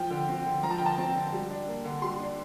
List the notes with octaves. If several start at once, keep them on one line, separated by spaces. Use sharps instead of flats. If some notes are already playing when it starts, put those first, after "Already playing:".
Already playing: F3 G5
D3
C4
D3
F3 A#5
A5
D3 G5
A5
C4
D3
G3
D4
A#3
D3
G3 C6
D4